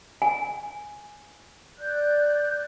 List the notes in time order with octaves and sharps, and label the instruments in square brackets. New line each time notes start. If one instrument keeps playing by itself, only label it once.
[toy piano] G#5
[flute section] D5 F#6 G6